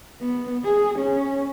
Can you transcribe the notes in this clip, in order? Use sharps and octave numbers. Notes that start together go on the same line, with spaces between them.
B3
G#4
C#4